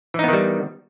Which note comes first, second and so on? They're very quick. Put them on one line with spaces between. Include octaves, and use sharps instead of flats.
E3 D#4 B3 D#3 G3